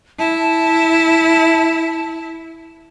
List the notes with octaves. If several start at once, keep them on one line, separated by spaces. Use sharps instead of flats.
E4 A5